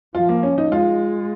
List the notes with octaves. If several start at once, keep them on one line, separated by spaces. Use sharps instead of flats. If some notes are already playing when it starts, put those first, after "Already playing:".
F3 F4
A#3
C#4
D#4
G#3 F4